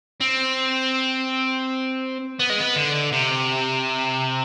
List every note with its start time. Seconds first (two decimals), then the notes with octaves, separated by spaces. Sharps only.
0.21 C4
2.40 B3
2.50 G#3
2.60 B3
2.76 D3
3.13 C3